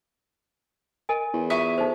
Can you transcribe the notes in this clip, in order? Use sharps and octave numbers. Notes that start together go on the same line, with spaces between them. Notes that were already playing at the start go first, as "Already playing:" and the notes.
A#4 D#5 G#5
E2
F4 E5 G#5 C#6 D#6
D#4 A4 C5